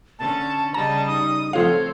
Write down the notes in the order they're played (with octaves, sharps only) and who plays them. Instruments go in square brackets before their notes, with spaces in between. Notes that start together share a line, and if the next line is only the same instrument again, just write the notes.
[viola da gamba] D3 C#4 [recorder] A5
[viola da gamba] C#3 G3 D#5 [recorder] A5 [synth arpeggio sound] A#5
[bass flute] D#4 [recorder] D#6
[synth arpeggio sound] F3 F4 F5 [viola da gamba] A3 C4 [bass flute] A4 [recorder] C#5